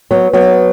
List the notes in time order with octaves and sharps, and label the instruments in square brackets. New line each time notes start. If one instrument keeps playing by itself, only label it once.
[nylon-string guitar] F#3 B3
F#3 B3